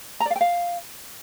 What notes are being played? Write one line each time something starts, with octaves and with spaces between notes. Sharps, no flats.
A#5
D5
F5
G5
F5